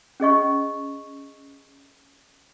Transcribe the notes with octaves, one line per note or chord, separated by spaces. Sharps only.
C#4 G#4 D#5 C#6